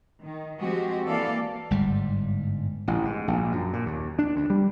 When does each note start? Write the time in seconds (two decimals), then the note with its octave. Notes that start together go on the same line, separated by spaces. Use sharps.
0.22 D#3
0.58 F3 G#3 C4 F#4 G4
1.06 E3 A#3 A4 D5 F5
1.70 G1 G#2 G3
2.88 A1
3.05 G#2
3.28 A#1
3.52 F#2
3.73 A#2
3.86 D#2
4.19 D4
4.36 D2
4.50 G3